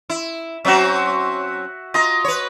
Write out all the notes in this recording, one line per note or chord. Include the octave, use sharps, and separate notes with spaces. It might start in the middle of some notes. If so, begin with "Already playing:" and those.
E4
F#3 C4 C#4 F#4 E5
F4 D#5 A#5
B4 C#5